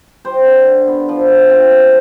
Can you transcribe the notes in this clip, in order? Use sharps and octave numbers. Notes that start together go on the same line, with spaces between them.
G3 C5
D3
D3
B3
F3
G2
C4
A3